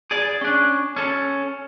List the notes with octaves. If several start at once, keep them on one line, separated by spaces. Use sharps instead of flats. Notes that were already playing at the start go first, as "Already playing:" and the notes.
G#4 D5
C#4 D4
C#4 A4